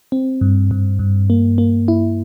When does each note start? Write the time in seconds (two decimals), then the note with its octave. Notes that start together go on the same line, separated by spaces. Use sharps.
0.12 C4
0.41 G2
0.71 G2
0.99 G2
1.30 A#3
1.58 A#3
1.88 E4